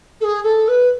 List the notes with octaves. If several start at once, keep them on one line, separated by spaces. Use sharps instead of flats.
A4
G#4
A4
B4